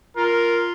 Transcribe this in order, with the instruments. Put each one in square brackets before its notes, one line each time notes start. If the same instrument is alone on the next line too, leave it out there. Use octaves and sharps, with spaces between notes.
[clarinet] F4 [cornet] A#4